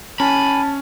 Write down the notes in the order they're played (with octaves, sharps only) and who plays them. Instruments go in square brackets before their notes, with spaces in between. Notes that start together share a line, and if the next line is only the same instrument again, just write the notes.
[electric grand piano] C#4 [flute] G#5 [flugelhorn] A5 [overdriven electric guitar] B5